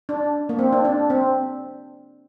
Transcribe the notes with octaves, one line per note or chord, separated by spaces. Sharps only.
D4
A#3
C4
D4
D4
C4